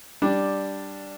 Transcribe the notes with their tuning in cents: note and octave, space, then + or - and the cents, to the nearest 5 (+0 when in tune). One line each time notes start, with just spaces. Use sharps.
G3 +0 D4 +0